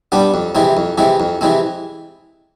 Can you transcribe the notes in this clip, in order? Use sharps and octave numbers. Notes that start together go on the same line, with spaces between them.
G3 B3 D4
F2
C3 E3 G#3 C4
F2
C3 E3 G#3 C4
F2
C3 E3 G#3 C4